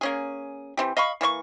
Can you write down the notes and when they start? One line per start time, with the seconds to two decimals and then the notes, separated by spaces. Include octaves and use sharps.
0.01 A#3 C#4 G#4
0.77 E3 C4 G4
0.97 D#5 F5 B5 C#6
1.21 E3 A#3 D5 C#6